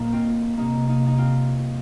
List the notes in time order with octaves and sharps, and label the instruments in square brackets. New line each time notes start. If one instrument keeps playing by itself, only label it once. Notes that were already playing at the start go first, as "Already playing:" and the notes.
Already playing: [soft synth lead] A#2 [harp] A#3 D#4
[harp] C4 F4
[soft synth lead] C3 [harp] A#3 D#4
[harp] A#3 D#4
D#4
C4 F4